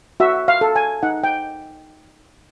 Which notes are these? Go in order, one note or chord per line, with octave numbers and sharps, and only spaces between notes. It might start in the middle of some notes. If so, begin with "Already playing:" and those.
F#4 E5
F5
A4
G#5
D#4 F#5
G5